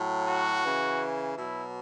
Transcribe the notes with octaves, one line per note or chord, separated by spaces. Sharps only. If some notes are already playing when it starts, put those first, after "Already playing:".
Already playing: A2 F#3
F#4
C#3 E3
B2 F#3 E4